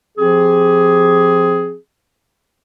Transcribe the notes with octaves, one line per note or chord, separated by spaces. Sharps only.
F3 C4 G4 G#4